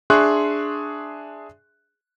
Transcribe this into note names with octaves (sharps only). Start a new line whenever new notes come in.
D4 G#4 E5 C6 C#6 F#6